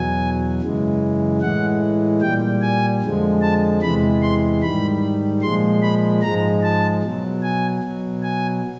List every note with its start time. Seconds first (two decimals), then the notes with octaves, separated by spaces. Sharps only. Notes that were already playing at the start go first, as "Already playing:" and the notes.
Already playing: E2 B2 F#3 G#5
0.61 F#2 C#3 E3 G#3
1.41 A2 E3 G#3 F#5
2.21 A#2 G3 G5
2.61 G#5
3.02 F2 D3 F3 G#3
3.41 A5
3.82 E2 C3 E3 G#3 B5
4.22 C6
4.62 G#2 D#3 G3 B5
5.42 A#2 F3 G#3 C6
5.82 B5
6.22 G#2 F3 G#3 A#5
6.62 A5
7.03 B2 F#3
7.42 G#5
7.83 B2 F#3
8.22 G#5